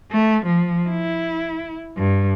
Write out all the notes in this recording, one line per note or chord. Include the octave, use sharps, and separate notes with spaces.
A3
F3
E4
G2